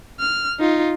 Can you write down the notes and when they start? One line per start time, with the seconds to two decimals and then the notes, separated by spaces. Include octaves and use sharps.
0.20 F6
0.60 D#4 F4